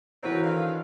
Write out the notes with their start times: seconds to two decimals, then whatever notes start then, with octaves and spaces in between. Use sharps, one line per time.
0.23 E3 A#3 C4 F#4 B4 C#5
0.43 D3 D#3 F5